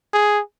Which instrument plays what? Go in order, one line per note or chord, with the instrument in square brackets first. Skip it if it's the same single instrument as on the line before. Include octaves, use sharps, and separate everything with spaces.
[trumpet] G#4